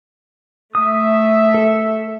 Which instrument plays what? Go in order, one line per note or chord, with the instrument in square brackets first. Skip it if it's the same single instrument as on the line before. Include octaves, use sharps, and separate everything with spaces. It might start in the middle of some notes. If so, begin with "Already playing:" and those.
[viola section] A3 E5 [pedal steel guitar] D#6
[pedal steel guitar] A4